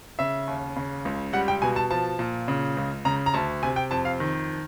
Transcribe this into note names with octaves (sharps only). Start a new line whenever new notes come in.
C#3 E5
D#2
C#3
C#2
G3 F#5
G5
B2 G#5
A5
F3 A5
A#2
C#3
C#2
C#3 A#5
A#5
D2 A5
C3 G#5
G5
F2 A5
F5
D#3